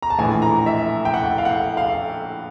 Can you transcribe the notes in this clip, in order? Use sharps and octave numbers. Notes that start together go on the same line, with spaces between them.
A#5
A5
A#1 A2 E3 G#5
A#5
E5
G5
F#5
F5
F#5
F5